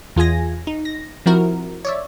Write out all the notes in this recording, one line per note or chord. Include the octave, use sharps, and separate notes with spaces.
E2 F4 G#4 G#5 A#6
D#4
A#6
F3 C4 E4 F#4 A#4
C#5 D5 E5